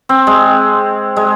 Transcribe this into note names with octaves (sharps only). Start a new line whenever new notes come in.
C4
G#3
G#3